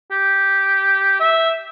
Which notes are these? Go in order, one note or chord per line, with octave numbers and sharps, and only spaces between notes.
G4
E5